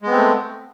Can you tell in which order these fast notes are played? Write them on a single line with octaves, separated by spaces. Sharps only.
G#3 B3 C4 A3